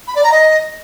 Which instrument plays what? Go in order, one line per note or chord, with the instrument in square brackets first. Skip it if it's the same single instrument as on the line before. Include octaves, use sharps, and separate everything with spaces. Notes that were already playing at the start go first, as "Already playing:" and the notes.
[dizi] B5
D5
A#5
D#5